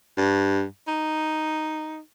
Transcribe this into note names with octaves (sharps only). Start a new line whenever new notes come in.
G2
D#4